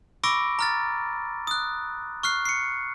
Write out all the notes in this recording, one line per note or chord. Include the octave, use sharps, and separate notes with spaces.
B5 C#6 D6 E6 A#6 D7
A#5 F6 A6
D#6 F#6
C#6 F6 F#6 C7
C7 C#7